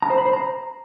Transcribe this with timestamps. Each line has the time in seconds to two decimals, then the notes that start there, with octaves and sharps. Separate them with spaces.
0.02 A#5
0.10 C5
0.18 B5
0.26 C5
0.33 A#5